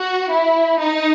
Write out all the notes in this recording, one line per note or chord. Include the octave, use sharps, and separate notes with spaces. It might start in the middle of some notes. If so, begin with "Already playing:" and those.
Already playing: F#4
E4
D#4